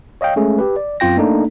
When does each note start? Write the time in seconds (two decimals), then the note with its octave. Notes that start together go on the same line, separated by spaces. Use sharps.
0.21 C#5 D#5 F5 G5
0.36 G#3 A3 C#4 G#4
0.59 G4 B4
0.76 D5
1.00 F#2 C4 F4 G5 A#6
1.17 A3 A#3 D4 D#4 A4